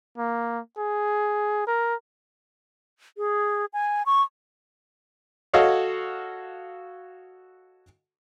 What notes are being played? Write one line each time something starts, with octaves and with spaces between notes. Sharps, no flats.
A#3
G#4
A#4
G#4
G#5
C#6
F#4 A4 C#5 D#5 F5 F#5